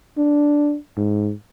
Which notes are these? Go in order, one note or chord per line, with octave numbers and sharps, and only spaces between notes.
D4
G#2